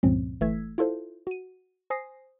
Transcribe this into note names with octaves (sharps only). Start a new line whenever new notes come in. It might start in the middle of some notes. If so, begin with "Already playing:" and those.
C#2 G2 A#2 F3 C4 C#4
G1 E3 A3 E6 G#6 B6
E4 F4 A4 C5
F#4 D#7
C5 G#5 D#6 A#6 C7